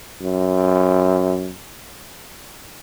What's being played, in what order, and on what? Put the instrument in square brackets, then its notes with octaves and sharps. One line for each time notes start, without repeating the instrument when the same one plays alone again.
[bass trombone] F#2